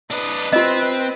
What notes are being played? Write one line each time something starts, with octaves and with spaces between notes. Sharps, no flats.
D4 B4 D#5
C4 F4 D#5